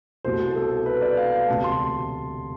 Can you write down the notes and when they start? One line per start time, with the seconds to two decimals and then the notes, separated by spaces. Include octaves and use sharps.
0.25 C2 B2 A3 E4 C5
0.55 A4
0.86 B4
1.01 D5
1.17 F5
1.48 E1 D2 C3 A5
1.64 C6